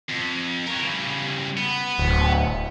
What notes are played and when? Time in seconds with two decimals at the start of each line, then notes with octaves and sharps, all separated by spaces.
0.09 F2
0.66 A#4 C#5
0.81 C#3 G3
1.57 B3
1.99 D1